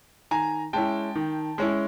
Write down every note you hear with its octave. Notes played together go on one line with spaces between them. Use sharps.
D#3 G#5 A#5
G#3 C#4 E4 G5 A5
D#3
G#3 C#4 E4